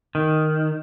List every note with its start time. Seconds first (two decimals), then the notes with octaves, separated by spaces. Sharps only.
0.15 D#3